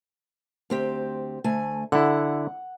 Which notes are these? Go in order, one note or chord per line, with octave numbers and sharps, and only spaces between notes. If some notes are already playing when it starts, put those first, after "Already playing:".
D2 C4 G4
D2 A3 G#5
D3 E4 F#5